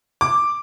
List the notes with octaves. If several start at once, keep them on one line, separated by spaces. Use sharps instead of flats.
D6